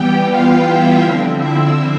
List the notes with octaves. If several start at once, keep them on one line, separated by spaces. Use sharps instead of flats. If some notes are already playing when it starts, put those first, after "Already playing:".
Already playing: E3 G3 B3 G4 G5
F4 F5
E4 E5
D3 F3 C4
E4 E5